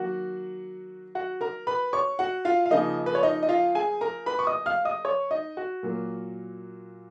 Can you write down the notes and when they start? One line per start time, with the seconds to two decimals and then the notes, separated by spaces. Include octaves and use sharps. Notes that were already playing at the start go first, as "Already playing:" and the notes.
Already playing: D#3 F#3 A#3 F#4 F#5
1.15 F#4 F#5
1.41 A#4 A#5
1.67 B4 B5
1.93 C#5 C#6
2.19 F#4 F#5
2.45 F4 F5
2.66 F5
2.71 C#3 F3 A#3 D#4 D#5
3.06 B4
3.15 C#5
3.23 D#4 D#5
3.43 D#5
3.49 F4 F5
3.75 G#4 G#5
4.01 A#4 A#5
4.26 B4 B5
4.39 C#6
4.47 D#5 D#6
4.66 F5 F6
4.85 D#5 D#6
5.05 C#5 C#6
5.31 D#4 D#5
5.57 F#4
5.83 A#2 F#3 A#3